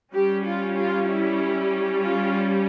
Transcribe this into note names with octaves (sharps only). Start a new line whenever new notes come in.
G3 C#4 G4
F4
F4
E4
F4